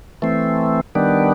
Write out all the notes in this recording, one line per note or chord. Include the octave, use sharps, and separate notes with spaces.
E3 A3 C4
D#3 G3 B3 D4